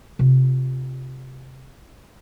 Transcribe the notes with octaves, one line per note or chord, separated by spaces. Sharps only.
C3 F4